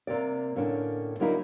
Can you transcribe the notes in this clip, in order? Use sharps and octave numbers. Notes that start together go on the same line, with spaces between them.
C3 A#3 D5
A2 D3 A#3 C#4 D4
D3 F#3 A#3 D#4 E4